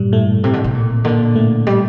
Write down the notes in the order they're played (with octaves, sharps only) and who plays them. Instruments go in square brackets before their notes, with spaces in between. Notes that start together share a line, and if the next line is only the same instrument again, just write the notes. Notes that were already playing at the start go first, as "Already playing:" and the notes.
Already playing: [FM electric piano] G2 G3 [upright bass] A#2
[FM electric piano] A2 A3
[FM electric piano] A2 A3 [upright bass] C3
[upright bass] D3
C3
A#2
[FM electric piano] A#2 A#3 [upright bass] D3
[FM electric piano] A2 A3
[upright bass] G3